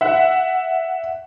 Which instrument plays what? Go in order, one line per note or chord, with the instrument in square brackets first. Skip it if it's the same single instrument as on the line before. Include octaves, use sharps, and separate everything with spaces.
[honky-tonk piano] E5 F#5